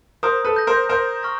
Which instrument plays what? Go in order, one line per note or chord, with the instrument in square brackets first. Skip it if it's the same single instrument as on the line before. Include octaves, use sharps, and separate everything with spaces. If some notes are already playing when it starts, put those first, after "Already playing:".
[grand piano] A#4 C5 [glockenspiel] D#6
[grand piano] A4 B4
[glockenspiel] G6 A#6
[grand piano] A#4 C5
[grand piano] A#4 C5 [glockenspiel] A#5
[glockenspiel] C#6 F6 A#6